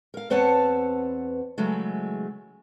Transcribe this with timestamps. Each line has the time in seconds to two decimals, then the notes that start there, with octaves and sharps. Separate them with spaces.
0.14 A#4 F5
0.30 E2 C4 B4 C#5 F#5 A5
1.58 C#3 E3 F#3 G#3 A3